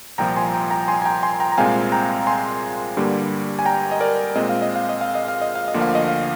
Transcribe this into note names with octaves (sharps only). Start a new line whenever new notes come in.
C2 A#2 F3 G5 A#5
G#5 C6
G5 A#5
G5 A#5
G#5 C6
G#5
G5 A#5
G#5 C6
G5 A#5
A#5
C2 A#2 G#3 C4 F5 G#5
G5 A#5
G#5 C6
G2 D3 G3 A#3
G#5
G5 A#5
D#5
A#4 D5
A#2 G#3 C4 D#5
F5
D#5
F5
D#5
F5
D#5
F5
D#5
F5
D#5
D2 D3 F3 A#3
F5
D#5
F5